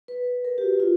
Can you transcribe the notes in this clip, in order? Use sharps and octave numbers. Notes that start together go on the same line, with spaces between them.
B4
A#4
G4
F#4
F4